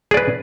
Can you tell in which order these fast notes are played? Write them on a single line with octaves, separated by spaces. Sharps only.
G#4 D5 B4